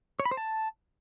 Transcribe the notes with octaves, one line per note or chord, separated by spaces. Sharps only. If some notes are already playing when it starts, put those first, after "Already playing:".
C#5
B5
C5
A5